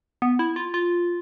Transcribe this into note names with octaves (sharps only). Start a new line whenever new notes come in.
B3
E4
F4
F4